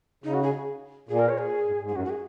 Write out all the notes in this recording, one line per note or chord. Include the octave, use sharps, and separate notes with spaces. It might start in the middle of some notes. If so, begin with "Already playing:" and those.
C#3 D#4
F#4
G#4
A#2 G#4
A#4
C#5
G#4
G#2
G#2
G#4
F#2 F#4
F#4
G#4